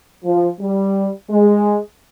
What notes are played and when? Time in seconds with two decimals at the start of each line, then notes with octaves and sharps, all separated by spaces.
0.24 F3
0.60 G3
1.30 G#3